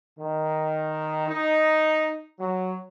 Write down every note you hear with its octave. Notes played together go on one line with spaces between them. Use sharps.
D#3
D#4
F#3